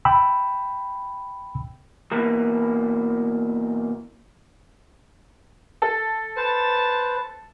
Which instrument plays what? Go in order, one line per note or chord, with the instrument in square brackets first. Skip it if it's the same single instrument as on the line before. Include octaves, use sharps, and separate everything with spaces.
[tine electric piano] G5 B5 E6
[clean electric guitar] B2 E3 A#3
[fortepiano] A4
[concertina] B4 C5 [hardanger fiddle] A5